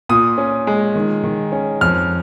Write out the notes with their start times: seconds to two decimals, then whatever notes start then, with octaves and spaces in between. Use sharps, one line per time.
0.09 A#2 D#6
0.38 C#4
0.67 G#3
0.95 D#3
1.23 D#3
1.52 C#4
1.81 F2 F6